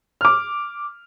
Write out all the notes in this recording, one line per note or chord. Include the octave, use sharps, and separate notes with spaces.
D6 F6